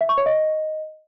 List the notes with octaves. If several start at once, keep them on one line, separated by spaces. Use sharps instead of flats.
E5
C#6
C#5
D#5